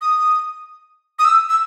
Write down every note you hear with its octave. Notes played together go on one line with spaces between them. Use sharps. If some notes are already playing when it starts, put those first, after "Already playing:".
D#6
D#6
E6
E6